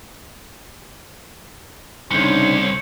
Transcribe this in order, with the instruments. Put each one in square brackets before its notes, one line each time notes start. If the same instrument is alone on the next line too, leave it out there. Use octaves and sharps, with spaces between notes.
[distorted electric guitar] C2 [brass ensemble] C#3 D4 D#4 [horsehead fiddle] C5 C#5 [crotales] C#7